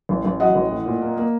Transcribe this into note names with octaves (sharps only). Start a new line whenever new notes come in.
A1
A1
F#3 D#5 F#5
A1
A2
A#2
A#3
A#3